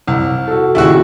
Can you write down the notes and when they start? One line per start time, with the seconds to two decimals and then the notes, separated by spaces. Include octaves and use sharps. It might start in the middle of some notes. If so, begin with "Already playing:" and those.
0.08 C2
0.48 F#4 A4
0.75 D#2 A#2 C#3 E4 F#4